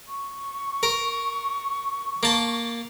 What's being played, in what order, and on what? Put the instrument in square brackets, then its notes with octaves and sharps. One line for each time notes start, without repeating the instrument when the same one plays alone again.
[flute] C#6
[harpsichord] A#4
A#3 A5